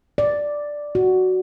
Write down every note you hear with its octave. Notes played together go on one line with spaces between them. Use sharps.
D5
F#4